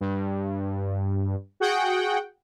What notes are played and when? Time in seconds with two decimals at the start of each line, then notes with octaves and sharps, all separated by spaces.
0.01 G2
1.60 F#4 G#4 F#5 G5